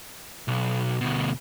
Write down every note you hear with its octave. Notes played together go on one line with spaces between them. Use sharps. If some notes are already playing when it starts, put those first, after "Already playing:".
B1
D2 B2